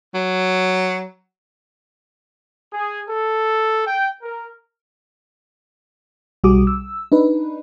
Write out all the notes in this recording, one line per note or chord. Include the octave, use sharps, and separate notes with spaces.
F#3
G#4
A4
G5
A#4
B1 G3 F#4 G#4 D6 D#6
E6
D4 D#4 B4